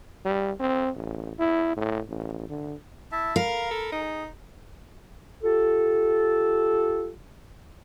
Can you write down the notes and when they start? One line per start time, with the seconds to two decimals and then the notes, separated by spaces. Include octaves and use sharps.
0.25 G3
0.60 C4
0.95 A1
1.39 E4
1.77 A2
2.09 A1
2.50 D3
3.12 E4 E5 A5
3.36 A#4 F5 A#5 B5
3.71 A4
3.92 D#4 G#4
5.43 F4 G4 A4